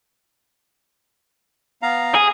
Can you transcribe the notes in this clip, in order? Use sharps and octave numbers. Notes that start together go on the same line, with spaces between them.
B3 F5 A#5
G#4